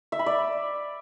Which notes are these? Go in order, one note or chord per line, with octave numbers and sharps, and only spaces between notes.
E5
B5
D5